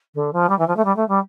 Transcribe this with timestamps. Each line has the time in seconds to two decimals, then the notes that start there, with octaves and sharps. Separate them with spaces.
0.15 D3
0.33 F3
0.49 G3
0.59 E3
0.68 F3
0.77 A3
0.85 G3
0.96 A3
1.08 G3